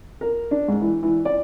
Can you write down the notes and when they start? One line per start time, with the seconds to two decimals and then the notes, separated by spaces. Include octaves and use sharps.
0.21 A#4
0.51 D4
0.68 G#2
0.81 E3
1.03 E3
1.25 D5